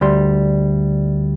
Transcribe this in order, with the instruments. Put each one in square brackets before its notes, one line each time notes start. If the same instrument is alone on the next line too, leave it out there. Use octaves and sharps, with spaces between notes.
[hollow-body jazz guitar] D2 G3 C6